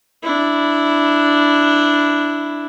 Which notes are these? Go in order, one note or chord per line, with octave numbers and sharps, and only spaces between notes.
D4 E4